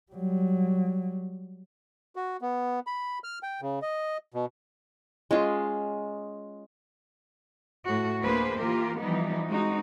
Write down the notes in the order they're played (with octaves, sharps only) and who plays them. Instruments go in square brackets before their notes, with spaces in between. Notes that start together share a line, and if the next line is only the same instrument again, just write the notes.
[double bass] F#3 G3
[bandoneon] F#4
B3
B5
F6
G5
C#3
D#5
B2
[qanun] G#3 C#4 F4
[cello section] A2 F#4
D2 A#3 B3 G#4 B4 C5
E3 A#3 F4 G4 A#4
E3 F3 G3 B3 D#4
G#3 C4 D#4 F#4